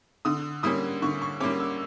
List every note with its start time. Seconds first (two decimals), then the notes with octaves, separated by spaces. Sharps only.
0.25 D3 D#6
0.63 G3 A#3 C#4 D#6
1.02 D3 C#6
1.22 C#6
1.40 G3 A#3 C#4 D6
1.60 E6